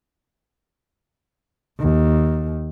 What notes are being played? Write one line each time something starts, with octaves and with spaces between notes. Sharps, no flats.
D#2